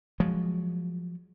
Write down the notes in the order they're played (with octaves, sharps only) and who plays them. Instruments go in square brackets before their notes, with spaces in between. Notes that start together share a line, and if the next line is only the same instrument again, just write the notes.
[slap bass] F3 F#3 G#3